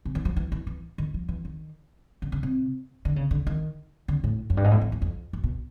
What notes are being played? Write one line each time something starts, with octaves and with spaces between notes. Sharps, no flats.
C3
E3
F3
E3
E3
E3
D#3
F3
E3
D#3
D3
C#3
C3
D3
C#3
D3
D#3
D3
A2
F#2
G2
G#2
A2
F2
E2
F2
F#2
B2